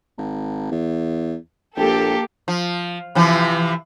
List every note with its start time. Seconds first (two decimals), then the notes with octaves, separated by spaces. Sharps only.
0.18 G#1
0.71 E2
1.76 A#1 A#3 G4 A4
2.48 F3
3.15 C3 E3 F3